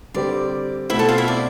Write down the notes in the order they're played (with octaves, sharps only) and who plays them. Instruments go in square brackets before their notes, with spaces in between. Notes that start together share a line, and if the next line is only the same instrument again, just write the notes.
[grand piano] D3 G3 C4 G4 [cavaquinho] D5
[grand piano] B2 A3 C4 [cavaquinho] E4 E5
[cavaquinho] A4 A5
F4 F5
E4 E5
D5